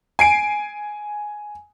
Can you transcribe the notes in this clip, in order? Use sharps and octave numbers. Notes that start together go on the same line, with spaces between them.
G#5 C7 D7